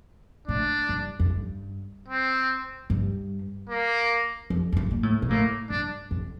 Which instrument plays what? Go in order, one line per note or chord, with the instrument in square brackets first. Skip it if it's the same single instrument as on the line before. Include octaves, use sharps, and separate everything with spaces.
[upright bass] A2 [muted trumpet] D4
[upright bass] G2
F2
G2
[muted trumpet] C4
[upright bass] G2
[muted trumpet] A#3
[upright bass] F2
F2
G2
A#2
A2
A#2
[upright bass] A2 [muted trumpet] A#3
[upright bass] G2 [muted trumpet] D4
[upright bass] F2